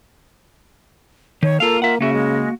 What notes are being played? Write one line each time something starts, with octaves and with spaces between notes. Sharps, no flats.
D#3 C#5
A#3 F4 A4 F5
A#3 F4 E5 F#5
C#3 A#3 F#4 E5
G#3